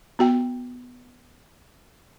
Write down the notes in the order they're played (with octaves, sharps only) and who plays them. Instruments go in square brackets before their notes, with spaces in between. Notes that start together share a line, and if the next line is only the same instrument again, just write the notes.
[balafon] B3 F#4 G5